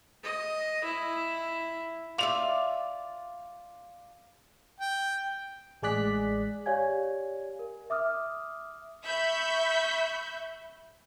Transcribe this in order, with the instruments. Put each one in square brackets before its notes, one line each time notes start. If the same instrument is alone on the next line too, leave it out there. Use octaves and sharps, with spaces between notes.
[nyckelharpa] D#5
E4
[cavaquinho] F4 D5 E5 [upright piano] D6 F7
[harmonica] G5
[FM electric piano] A1 G#3 G#4 D5 F#6 B6
[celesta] G4 C#5 D5 F5 G#5 G#6
A#4
E5 D6 D#6 F6
[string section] E5 B5 C#6 G6